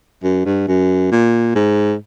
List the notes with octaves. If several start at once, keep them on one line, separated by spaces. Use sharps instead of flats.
F#2
G2
F#2
A#2
G#2